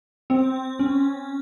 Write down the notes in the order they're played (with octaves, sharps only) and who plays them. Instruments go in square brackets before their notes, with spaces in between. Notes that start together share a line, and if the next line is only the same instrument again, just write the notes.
[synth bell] C4
C#4